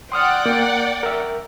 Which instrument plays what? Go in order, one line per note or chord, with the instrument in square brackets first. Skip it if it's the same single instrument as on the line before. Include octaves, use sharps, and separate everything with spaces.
[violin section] D5 F#5 G5 [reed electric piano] C6 D#6 F6
[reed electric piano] A#3
A#4 E5